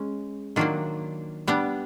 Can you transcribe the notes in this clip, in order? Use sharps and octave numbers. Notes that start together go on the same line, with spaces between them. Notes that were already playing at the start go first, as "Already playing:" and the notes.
Already playing: G#3 C#4
D#3 F#3 A#3 D4 F4
G3 B3 D4